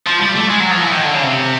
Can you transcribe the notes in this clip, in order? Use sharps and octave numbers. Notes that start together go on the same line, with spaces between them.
F3
G3
A3
G#3
F#3
F3
E3
D#3
D3
C#3
C3